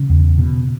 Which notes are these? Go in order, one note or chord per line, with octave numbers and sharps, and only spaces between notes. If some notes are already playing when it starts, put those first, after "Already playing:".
Already playing: C#3 C#4
E2
B2